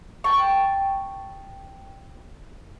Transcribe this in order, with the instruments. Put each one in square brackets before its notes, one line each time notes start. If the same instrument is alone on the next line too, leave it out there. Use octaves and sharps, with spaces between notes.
[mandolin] G5 A5 C#6